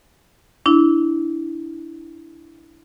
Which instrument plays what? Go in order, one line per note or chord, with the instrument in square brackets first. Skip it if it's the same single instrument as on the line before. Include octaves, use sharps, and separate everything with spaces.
[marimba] D4 E4